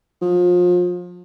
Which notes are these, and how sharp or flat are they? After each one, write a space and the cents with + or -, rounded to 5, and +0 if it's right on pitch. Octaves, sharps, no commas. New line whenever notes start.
F3 +30